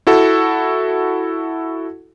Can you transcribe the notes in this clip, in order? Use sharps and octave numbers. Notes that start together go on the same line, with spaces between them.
E4 F#4 A4